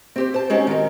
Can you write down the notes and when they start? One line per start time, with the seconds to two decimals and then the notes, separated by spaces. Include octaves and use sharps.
0.16 C4 G4 C5
0.34 C5 A5
0.50 G#3 C4 C#4 D#4 F#4 G4
0.67 D#3 C4 A#4